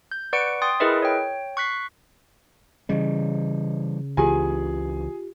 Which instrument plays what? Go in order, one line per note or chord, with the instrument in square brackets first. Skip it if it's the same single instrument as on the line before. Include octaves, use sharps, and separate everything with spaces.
[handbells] G6
B4 D5 F#5 C#6 C#7 D7
G5 C6 D#6 A6
E4 G#4 A#4 B4 D#5 E5
C#5 G5
C#6 F#6 B6 C7
[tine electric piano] C#3 [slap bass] E3 G3 [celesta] D#5
[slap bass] C#2 E3 [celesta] F4 G4 [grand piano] G#4 G#5